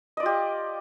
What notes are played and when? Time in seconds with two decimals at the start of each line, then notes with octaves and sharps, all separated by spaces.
0.17 D#5
0.20 D5
0.23 F4
0.26 G4